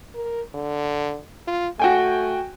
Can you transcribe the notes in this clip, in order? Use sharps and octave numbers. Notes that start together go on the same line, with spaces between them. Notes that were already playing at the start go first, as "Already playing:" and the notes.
A#4
D3
F4
A3 F#4 G5 G#5